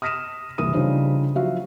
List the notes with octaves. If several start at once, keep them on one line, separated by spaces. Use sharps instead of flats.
D#6 F6 A#6 B6 D#7 E7
F#1 C2 E3 A#4 D#6 D#7
C#3 F3 G3 D4 D#4 C5
F3 F#3 F#4 E5 F5